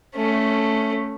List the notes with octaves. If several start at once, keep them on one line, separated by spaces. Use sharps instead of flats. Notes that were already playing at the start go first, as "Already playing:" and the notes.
A3 C#4